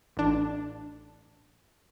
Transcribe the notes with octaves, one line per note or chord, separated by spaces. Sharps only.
A1 D4